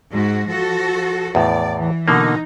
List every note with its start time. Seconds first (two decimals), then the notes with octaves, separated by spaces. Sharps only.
0.12 G#2 F#4
0.48 F3 F#4 A4
1.35 E2 A2 D5
1.78 E3
2.08 B2 D3 A#3 D#4